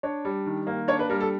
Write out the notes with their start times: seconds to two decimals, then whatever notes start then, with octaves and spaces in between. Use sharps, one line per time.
0.03 D4 C#5
0.25 G3
0.46 D#3
0.67 A#3
0.88 D4 C#5
0.99 B4
1.10 G3 A#4
1.20 A4